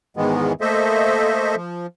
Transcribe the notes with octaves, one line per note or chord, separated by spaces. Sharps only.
E2 G#2 D#3 E3 G#3 B3
A3 A#3 A4 C5 D#5 E5
F3